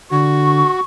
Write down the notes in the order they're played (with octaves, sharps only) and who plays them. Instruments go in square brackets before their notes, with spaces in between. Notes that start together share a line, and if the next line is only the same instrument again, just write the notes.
[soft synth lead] D3 [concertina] F#4 [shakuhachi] C#6